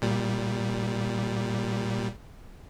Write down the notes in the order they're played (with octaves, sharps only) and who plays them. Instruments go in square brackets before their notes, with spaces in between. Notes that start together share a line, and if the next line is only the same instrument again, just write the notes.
[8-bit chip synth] A#2 G3